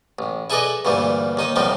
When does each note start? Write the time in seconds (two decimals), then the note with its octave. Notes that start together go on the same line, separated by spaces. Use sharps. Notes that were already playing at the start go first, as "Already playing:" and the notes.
0.19 A1
0.50 E4 G#4 A4 B4 D5 D#5
0.85 D2 G2 A#2 E3 G3
1.37 D#2 D#4 D#6
1.56 E2 A2 F3 G3 C4 D#4